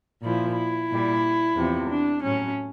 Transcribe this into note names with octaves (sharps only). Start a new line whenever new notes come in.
A#2 F3 E4
E4
A#2 G3
E2 C3 F3
D4
A2 F#3 C#4